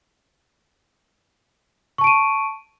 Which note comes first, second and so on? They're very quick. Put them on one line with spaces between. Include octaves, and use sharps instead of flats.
C#6 A5 D7 D#7